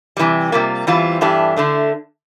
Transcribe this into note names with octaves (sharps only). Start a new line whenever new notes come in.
C3 E3 G3
C3 G3 A#3 F4
E2 E3 G3 C4 F4
G2 E3 A3 D4 G4
D3 A3 D4